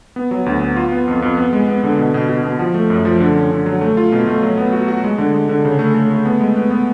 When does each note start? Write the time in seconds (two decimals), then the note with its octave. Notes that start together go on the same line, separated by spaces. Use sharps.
0.16 B3
0.31 F#3
0.46 D2
0.61 B3
0.76 F4
0.92 B3
1.08 F2
1.22 F2
1.37 B3
1.53 G#3
1.68 B3
1.84 D3
1.99 B2
2.14 B2
2.29 B2
2.44 B2
2.59 F3
2.74 A3
2.90 F#2
3.05 F3
3.20 D3
3.36 C#4
3.51 D3
3.66 F#3
3.81 A3
3.97 F4
4.12 B2
4.27 A3
4.43 F#3
4.58 B3
4.73 F#4
4.88 F#4
5.04 G#3
5.18 D3
5.34 G#3
5.49 D3
5.65 C#3
5.79 A3
5.94 A3
6.10 A3
6.25 B3
6.41 G#3
6.56 B3
6.71 B3